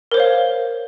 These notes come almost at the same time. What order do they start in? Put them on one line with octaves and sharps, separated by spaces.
A#4 C5 C#5 F5